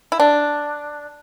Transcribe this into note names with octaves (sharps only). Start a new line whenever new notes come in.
E4
D4